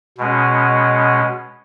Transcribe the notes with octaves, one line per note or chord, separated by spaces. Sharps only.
B2 G#3 C#4